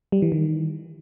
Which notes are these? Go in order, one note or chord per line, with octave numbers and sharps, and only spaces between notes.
G3
E3
D#3